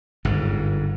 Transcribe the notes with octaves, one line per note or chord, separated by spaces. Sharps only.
G1 G#2